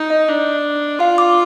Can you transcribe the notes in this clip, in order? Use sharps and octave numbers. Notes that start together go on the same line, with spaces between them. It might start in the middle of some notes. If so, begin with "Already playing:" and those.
Already playing: D#4
D#5
D4
F4 F5
D6